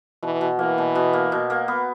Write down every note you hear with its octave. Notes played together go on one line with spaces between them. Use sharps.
B2 E3
B2
E3 A#3
B2
B2
A#3
B2
A#3
B3